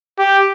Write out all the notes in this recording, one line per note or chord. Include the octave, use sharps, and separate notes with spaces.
G4